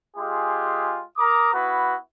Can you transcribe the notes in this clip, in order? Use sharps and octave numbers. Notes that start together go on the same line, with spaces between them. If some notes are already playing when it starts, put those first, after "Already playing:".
G#3 F4 G4 G#4
A#4 A#5 D6 D#6
B3 E4 F#4 B4